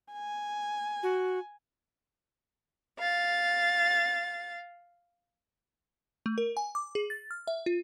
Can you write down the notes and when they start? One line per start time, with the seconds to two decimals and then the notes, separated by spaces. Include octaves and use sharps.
0.13 G#5
1.03 F#4
2.98 F5 A6
6.26 A3
6.38 A#4
6.57 G#5
6.75 D6
6.95 G#4
7.10 A6
7.31 F6
7.47 E5
7.66 F4